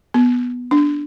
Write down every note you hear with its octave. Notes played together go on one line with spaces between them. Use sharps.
B3
D4